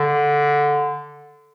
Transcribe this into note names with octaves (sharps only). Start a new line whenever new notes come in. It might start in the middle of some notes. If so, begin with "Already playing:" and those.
Already playing: D3